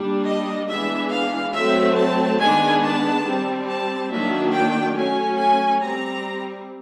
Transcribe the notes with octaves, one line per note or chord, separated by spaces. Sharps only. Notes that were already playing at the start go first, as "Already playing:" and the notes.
Already playing: G3 A#3 D4
D#5
E3 G#3 B3 D4 E5
F5
F#3 A3 C4 E5
A5
D#3 G#3 B3 D4 G#5
A5
G3 C4
A5
D#3 F#3 A#3 D4 E5
G5
F#3 A3 C#4 G#5
G#5
G3 C4 A#5